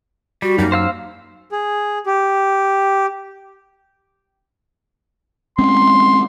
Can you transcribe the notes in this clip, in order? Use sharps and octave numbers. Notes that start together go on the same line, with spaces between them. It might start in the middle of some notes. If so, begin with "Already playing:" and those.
G3 F#4
F#2 A#3 D#4
C5 F5 E6
G#4
G4
G#3 C4 C#4 C6